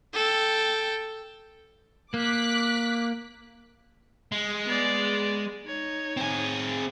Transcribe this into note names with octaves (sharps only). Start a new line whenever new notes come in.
A4 G5
A#3 D6 F#6 B6
G#3
B3 D5
D#4 C#5
C4 G#4